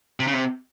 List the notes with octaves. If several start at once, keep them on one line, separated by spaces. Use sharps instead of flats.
C3
C#3
C3